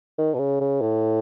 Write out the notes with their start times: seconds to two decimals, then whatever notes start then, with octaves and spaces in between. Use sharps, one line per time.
0.18 D#3
0.34 B2
0.39 C#3
0.60 C#3
0.81 A2